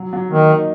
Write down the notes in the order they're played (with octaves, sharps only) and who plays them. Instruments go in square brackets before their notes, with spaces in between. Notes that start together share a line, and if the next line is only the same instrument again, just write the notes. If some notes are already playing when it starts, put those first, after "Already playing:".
Already playing: [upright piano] F#3
F#3
[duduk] D#3 [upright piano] A#3
[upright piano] D#4